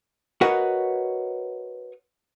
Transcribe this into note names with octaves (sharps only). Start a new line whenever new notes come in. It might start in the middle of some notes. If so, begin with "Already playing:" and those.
F#4 A#4 B4 C#5 D#5 F#5